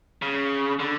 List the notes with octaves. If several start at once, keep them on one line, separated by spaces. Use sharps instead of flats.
C#3
D3